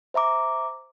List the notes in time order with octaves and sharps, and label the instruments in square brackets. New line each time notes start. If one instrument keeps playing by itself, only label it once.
[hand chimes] C5 E5 A#5 D6